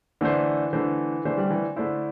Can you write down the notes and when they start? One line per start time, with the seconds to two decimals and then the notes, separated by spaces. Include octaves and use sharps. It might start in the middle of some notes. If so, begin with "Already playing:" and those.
0.21 D3 E3 A3 D4 C5
0.73 D3 E3 A3 D4 C5
1.25 D3 E3 A3 D4 C5
1.37 G3
1.50 E3
1.76 D3 A3 D4 E4 C5